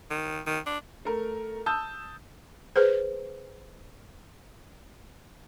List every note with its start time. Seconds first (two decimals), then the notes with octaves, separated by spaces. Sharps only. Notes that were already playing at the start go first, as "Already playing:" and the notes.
0.10 D#3
0.47 D#3
0.66 D4
1.05 A3 A#4
1.66 A5 D#6 E6 G6
2.76 G#4 B4 C5